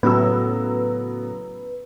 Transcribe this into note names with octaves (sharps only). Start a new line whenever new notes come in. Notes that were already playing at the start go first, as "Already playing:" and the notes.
A2 C#3 F#3 B3 B4 E6